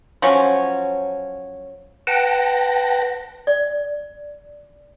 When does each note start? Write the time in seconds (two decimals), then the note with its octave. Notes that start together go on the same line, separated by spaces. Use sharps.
0.22 F3 F#3 C#4
2.07 B4 F#5 G5 A5 A#6
3.47 D5